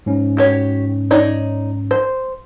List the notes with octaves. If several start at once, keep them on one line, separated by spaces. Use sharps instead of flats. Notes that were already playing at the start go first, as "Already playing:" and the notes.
G#2 C#4
F#4 G4 C#5
D#4 C#5 D5
C5